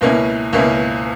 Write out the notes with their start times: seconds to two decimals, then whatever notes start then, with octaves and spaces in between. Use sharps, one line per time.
0.01 C#2 B2 A#3 C#4 E4
0.53 C#2 B2 A#3 C#4 E4